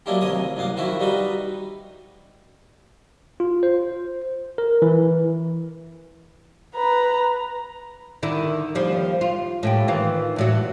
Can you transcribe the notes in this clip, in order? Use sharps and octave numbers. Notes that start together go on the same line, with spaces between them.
F#3 G#3 A#3 D4 E4 G4
A1 D#2 C3 C#5 D#5 D#6
C2 F#2 A#3 F5 F#5
D#3 F3 E4 F#4 E5
G3 D#4 F#4 B4
F4
C5
A#4
E3
B4 A#5
D3 D#3 E4
D#2 F3 G3
F4
A2 E4 G4
D#3 E3 F4
E2 A2 F#3